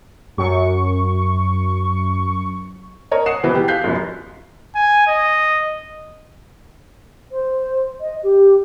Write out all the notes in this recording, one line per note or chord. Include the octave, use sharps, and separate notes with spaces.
F#2 C#6
A#4 C#5 D#5 A#5
F#5 D#6 C7 E7
E1 E3 B4
G4
F5 F#6 G6 B6 C7
F1 F#2
G#5
D#5
C5
D#5
G4